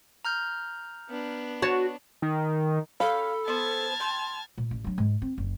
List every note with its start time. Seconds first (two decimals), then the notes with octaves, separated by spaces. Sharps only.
0.25 A#5 F6 G6
1.09 B3 D4
1.62 F#4 C#5 A5
2.22 D#3
3.00 A4 C#5 F5 G5 B5
3.48 B3 C5 A5 F6 G#6
4.00 G5 C6
4.58 A#2
4.71 A1
4.84 F#3 D4
4.98 G#2
5.22 C4
5.38 F#1